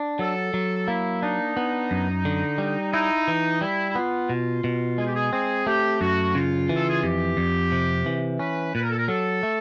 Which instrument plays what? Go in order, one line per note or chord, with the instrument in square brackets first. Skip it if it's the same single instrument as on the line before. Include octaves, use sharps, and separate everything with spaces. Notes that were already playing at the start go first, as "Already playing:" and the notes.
Already playing: [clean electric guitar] D4
[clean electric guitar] F#3 [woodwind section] A4
[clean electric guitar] F#3
[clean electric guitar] A#3 [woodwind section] E4
[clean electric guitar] D4 [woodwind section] D#4
[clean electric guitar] B3
F#2
D3
G3
[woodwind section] D#4 [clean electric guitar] E4
[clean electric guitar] E3
[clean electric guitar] G3 [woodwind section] E4
[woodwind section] E4
[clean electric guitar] B3 [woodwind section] F4
[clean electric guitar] B2
B2
[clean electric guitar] G#3 [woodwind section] G#4
[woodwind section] G4
G#4
[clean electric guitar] C4 [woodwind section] G#4
[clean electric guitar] A3 [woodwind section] G4
[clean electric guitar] F#2 [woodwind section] F#4
[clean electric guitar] C#3 [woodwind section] F4
[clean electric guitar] E3
[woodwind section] A4
G#4
[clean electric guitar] F2 [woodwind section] G4
[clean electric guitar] F2
C3
E3
[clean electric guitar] C#4 [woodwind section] B4
[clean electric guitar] A#2 [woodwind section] B4
[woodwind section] A#4
A4
A#4
[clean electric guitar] F#3 [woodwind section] A4
[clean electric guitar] A3